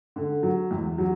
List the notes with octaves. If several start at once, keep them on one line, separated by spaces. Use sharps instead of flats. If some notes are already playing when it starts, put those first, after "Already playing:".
D3
F#3
E2
F#3